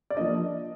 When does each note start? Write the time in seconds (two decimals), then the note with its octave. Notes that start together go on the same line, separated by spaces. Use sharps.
0.10 D5
0.17 F3 A#3 D4 D#5